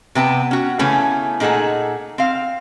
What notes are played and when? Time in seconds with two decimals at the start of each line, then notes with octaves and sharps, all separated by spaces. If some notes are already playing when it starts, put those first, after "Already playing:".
0.15 C3 B3 G5 A5
0.51 C#4 F#4
0.79 C#3 E3 A3 B3 C#4
1.40 A#2 D#4 G#4 A4 F#5
2.18 C4 F5